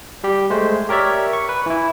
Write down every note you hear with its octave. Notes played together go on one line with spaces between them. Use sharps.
G3 G4
G#3 A3 C5
G4 A#4 C#5 D5 E5
C#6
B4
E3 E4